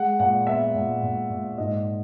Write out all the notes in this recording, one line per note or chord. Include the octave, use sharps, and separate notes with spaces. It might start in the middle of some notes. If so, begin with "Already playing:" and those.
Already playing: G#3 F#5
A#2 F#5
B3 E5
A#2
A#2
A#2
G#2 D#5